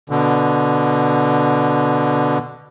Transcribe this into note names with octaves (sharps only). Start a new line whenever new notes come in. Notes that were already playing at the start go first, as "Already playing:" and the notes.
B2 D3